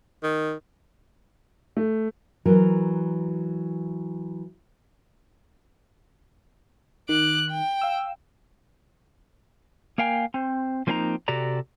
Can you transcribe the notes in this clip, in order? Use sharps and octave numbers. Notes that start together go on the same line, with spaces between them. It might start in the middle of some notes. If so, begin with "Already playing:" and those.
D#3
A3
E3 F#3 A#4
D#3 D6 F#6
G5
F5 E6
A#3 A#4 F5 G5 G#5
C4 C5
F3 A#3 C4 D4 D#4 A#5
C3 F#4 G4 A4 D5 A#5